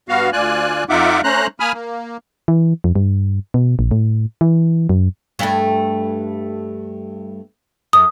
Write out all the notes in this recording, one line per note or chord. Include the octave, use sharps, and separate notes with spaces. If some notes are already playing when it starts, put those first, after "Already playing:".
G2 B3 F#4 F5
D2 F4 D5 G#5 F#6
F2 D#4 F4 E5 F#5 D6
A3 C#4 C5 A#5 F#6
A#3 G#5 B5 D#6 F6
A#3
E3
F2
G2
B2
A#1
A2
E3
F#2
G2 A3
F#2 D#6